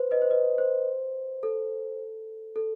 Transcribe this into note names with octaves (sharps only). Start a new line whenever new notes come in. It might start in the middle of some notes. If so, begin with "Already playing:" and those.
Already playing: B4 C5
B4 D#5
C5
B4 D#5
C5
A4
A4